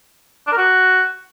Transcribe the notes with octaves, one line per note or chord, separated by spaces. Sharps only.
D4
A#4
F#4